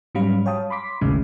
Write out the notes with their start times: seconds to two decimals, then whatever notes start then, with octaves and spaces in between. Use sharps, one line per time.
0.15 G#2 F#3 G3 C#4 F5 B5
0.46 C#5 F5 G5 A5 D#6
0.70 B5 C6 D6 B6
1.01 A1 D#2 A2 C#3 G#3